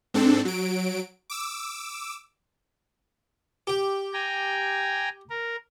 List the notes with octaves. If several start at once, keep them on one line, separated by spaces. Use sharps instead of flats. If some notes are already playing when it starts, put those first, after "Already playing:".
G#2 C4 D4 A4
F#3 D7
D6 E6
G4
G5 G#5 A#5
A#4